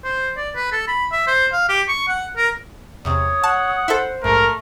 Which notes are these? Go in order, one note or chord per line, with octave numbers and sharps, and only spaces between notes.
C5
D5
B4
A4
B5
E5
C5
F5
G4
C#6
F#5
A#4
E2 C3 C#5 D#6
F#5 A5
E4 A4 C5
A#1 G#2 A3 A#4